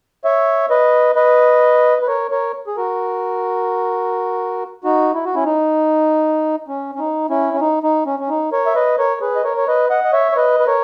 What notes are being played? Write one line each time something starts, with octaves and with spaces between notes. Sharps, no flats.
C#5 E5
B4 D#5
B4 D#5
B4
A#4 C#5
A#4 C#5
G#4
F#4 A#4
D#4 F#4
E4
F#4
C#4 E4
D#4
C#4
C#4
D#4
C#4 E4
C#4
D#4
D#4
C#4
C#4
D#4
A#4 C#5
E5
B4 D#5
A#4 C#5
G#4 B4
D#5
A#4 C#5
C#5
B4 D#5
D#5 F#5
D#5
C#5 E5
C#5
B4 D#5
B4
A#4 C#5